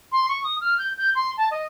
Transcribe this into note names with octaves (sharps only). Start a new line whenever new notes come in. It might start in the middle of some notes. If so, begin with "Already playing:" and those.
C6
C#6
D#6
F6
G6
G6
C6
A5
D#5